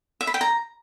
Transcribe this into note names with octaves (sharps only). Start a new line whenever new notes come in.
E5
B5
G5
A#5